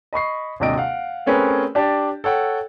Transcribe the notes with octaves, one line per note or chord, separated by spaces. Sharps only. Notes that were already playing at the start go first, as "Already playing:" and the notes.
D#5 B5 C#6 C7
D#1 G#1 C3 D4 D#5 D7
F5 F#5
A3 C4 C#4 G#4 A#4 B4
D4 G4 D5 A5
A4 C#5 F#5 G5